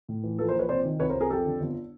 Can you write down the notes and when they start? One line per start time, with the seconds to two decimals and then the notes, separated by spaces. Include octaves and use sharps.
0.09 A2
0.23 E3
0.39 A#1 A4 B4
0.49 A#4 C5
0.54 A#1 B4 C#5
0.69 C3 C5 D5
0.85 D#3
0.99 C2 B4 C#5
1.09 A#4 C5
1.15 C2
1.21 G#4 A#4
1.30 F2 G4 A4
1.46 D3
1.61 G1